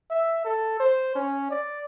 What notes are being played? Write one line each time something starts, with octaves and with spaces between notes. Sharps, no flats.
E5
A4
C5
C#4
D5